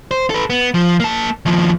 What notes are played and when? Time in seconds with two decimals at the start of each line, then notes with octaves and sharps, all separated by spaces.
0.11 C5
0.30 A4 B4
0.50 B3
0.74 F3
1.00 A#3 A5
1.46 D#2 F3